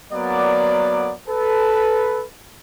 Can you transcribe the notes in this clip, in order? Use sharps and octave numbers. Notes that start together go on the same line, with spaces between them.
F#3 A#3 B3 A#4 D5
A4 B4